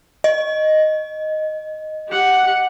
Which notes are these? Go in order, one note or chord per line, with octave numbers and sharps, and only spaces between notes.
D#5
G4 F#5